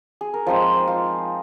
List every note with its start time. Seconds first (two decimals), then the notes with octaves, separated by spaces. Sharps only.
0.21 G#4
0.34 A#4
0.46 F3 G#3 C4 D#4 C5
0.88 F4